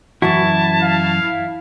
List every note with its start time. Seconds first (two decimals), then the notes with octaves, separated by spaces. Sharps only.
0.22 F#2 E3 E4 F#4 A5
0.83 F5